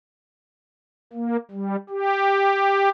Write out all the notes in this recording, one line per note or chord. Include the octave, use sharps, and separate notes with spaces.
A#3
G3
G4